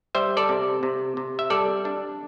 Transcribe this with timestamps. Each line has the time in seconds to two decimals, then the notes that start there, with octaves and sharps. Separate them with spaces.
0.15 G3 C5 E5
0.37 A4 D5
0.49 C3
0.83 C3
1.17 C3
1.39 E5
1.50 G3 A4 D5
1.85 D4